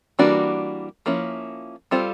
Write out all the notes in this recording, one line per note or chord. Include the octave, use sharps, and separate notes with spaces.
E3 G3 A#3 D4 F#4
F3 A#3 C#4 E4
G3 C4 F4 A4 C5